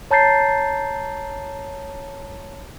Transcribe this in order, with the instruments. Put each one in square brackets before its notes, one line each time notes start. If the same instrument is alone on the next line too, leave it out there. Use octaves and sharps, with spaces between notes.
[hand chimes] C#5 A5 A#5 G6 A6 C7